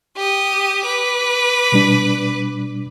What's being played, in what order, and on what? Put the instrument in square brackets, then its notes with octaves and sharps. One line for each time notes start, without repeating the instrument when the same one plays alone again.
[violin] G4 D#6
B4 D6
[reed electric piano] B2 G3 D4